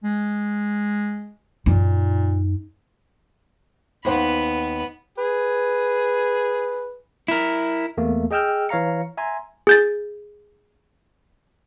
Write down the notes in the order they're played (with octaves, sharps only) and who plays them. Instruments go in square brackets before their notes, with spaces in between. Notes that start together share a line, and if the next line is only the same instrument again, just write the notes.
[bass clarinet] G#3
[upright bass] F#2 D#4 [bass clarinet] A#2
[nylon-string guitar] D#2 C5 F#5 [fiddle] B3 B5
[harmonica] G#4 [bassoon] B4
[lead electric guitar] E4 A#4
[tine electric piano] E2 A3 A#3
G#4 D#5 G5 E6 F6 G6
E3 C#5 F5 A#5 C#7
E5 G#5 A#5 C6
[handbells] G#4 G6 A6